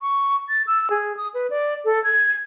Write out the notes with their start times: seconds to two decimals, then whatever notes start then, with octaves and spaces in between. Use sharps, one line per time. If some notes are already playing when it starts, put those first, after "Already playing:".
0.01 C#6
0.49 A6
0.67 E6
0.90 G#4
1.17 D#6
1.34 B4
1.50 D5
1.85 A4
2.04 G#6